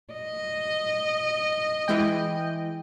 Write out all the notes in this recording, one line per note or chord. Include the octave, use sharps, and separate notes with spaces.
D#5
E3 G#3 G5